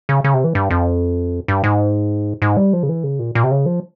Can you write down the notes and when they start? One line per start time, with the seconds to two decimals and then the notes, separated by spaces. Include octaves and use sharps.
0.09 C#3
0.24 C#3
0.34 C3
0.44 E3
0.55 G2
0.70 F2
1.48 G2
1.64 G#2
2.42 G#2
2.57 G3
2.73 F3
2.83 C#3
2.89 E3
3.04 C#3
3.19 A#2
3.35 A#2
3.44 C3
3.51 C#3
3.66 F3